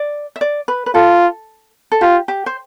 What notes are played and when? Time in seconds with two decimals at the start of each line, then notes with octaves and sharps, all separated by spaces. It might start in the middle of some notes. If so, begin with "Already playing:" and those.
Already playing: D5
0.36 E5
0.41 D5
0.68 B4
0.86 B4
0.94 F4 A4
1.92 A4
2.01 F4 G4
2.28 G4
2.46 C5